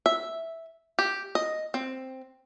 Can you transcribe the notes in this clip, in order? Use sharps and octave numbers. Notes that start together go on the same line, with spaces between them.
E5
G4
D#5
C4